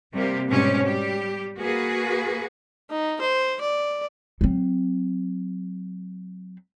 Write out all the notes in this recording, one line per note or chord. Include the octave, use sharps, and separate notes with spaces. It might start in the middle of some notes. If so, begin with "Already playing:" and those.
C3 G3 A#3 G4
G#2 B2 G3 C4 C#4 G4
G3 G4
A#3 F#4 G#4 B4
D#4
C5
D5
F#3 C4